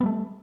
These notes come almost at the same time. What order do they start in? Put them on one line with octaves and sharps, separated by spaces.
B3 G3 A3